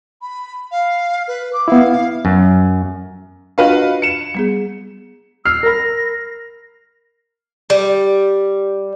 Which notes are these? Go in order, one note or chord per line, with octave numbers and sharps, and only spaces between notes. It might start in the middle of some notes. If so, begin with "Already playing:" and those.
B5
F5
B4
D6
B3 E4 F5
F#2
D4 F4 F#4 B4 D#5 F5
C#7 E7
G3 B3 G#4
E6 F6 C7
A#4 B5 A#6
G3